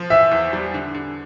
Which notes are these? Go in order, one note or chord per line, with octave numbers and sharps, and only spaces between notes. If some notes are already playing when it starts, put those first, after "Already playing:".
Already playing: F3
E3 E5
E2
G3
D3
D3